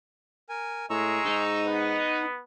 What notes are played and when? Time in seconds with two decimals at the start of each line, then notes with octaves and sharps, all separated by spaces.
0.49 A#4 G#5
0.90 A2 G#3 A#5 C#6 E6
1.26 G#2 D#4
1.66 B3 F#5